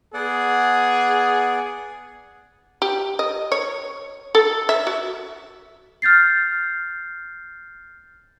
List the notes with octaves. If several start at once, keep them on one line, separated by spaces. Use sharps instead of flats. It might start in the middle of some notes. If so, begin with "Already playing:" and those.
B3 G#4 D5 F#5
G4
D#5
C#5
A4
E5
F#4
F6 G6 A6 C7